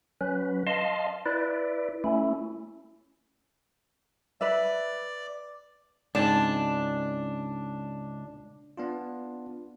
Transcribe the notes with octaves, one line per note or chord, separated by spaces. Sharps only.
F#3 C#4 B4
D#5 F5 A5 C6
E4 B4 D5
A3 C#4 E4
B4 D5 E5
C#2 G#2 C4 D4 A5
B3 D4 F4